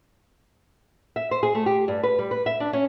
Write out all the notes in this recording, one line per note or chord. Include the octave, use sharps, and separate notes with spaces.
E5
C5
G#4
A3
G4
G2
B4
G3
B4
E5
D4
C#4